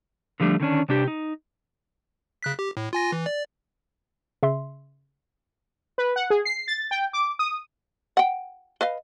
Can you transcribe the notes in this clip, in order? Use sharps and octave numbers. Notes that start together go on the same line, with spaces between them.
D3 F3 G3 A3 D4
D3 D#3 C#4 D4
C3 D4 G4
D#4
C#3 F#6 B6
G4
A2
F4 G#5 A#6
E3
D5
C#3 E5 C6
B4
F#5
G#4
C7
A6
G5
D6
D#6
F#5 G5
B4 D#5 F5